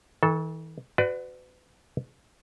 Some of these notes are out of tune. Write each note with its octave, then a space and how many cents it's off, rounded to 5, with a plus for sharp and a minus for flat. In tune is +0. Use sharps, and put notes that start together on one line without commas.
E3 -45 A4 -5
F#4 +0 B4 +35 D5 +15